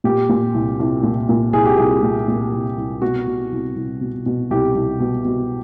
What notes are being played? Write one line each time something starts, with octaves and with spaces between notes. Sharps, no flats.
A#2 G4
A#2
C2
C2
A#2
A#2
C2 G#4
G4
C2 G#4
A#2
A#2
C2
C2
B2 F#4
B2
C2
C2
B2
B2
C2 G4
C2
B2
B2